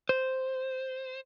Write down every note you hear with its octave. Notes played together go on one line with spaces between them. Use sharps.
C5